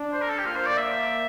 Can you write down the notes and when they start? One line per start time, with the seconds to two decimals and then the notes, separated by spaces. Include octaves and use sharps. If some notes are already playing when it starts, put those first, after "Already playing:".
Already playing: D4
0.13 C5
0.21 A#4
0.29 A4
0.38 G4
0.46 A#3 F4
0.56 C5
0.67 D5
0.77 E5